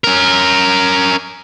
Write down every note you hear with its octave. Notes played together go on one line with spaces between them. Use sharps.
C#4 A#4